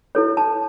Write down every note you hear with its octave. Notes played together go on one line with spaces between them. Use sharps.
E4 A4 C#5
A5